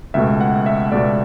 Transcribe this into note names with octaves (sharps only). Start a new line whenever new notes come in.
C#2 B2 A3 E5
F#5
E5
C#2 B2 A3 D5